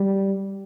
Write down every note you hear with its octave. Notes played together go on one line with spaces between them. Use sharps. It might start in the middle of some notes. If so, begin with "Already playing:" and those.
Already playing: G3